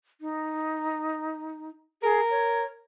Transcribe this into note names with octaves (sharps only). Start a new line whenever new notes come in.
D#4
G#4 A#4
C#5